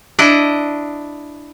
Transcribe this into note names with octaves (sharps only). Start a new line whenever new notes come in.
D4 E4 D#5